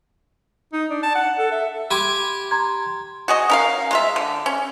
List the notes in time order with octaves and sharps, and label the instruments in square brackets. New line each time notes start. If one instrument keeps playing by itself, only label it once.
[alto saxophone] D#4
D4
A5
F#5
A4
E5
[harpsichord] G4 G#5 D6 [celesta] B5 C6
[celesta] A#5 C6 G#6
[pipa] F#4 G#4 D#5
C#4 A#4 F5
G#3 F4 E5
D3
C#4